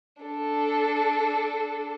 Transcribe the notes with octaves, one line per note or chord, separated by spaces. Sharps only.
D4 A4